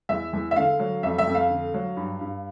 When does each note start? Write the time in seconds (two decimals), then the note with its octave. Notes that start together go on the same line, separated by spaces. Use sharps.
0.09 E2 E5
0.33 E2
0.51 E5
0.56 D3 F5
0.79 F#3
1.03 F2 E5
1.18 E5
1.27 F2
1.35 F5
1.50 D3
1.74 F#3
1.97 G2
2.21 G2